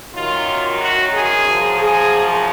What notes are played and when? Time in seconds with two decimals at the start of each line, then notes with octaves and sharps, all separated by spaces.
0.14 F#2 D#3 F#3 F4
0.80 F#4
1.13 G#4
1.45 F#2 F3
1.77 G#4